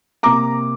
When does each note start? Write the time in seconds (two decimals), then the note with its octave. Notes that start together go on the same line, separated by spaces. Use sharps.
0.23 C3 A#3 A#5 D6